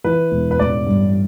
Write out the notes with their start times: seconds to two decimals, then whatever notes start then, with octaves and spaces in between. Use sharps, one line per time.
0.04 E3 B4
0.31 E1
0.51 B4
0.59 A1 D5
0.86 G2